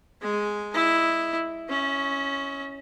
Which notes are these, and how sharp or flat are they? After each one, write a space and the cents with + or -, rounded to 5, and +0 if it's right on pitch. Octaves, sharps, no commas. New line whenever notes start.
G#3 +0 G#5 +0
E4 +0 D#5 -5
C#4 +0 E5 -45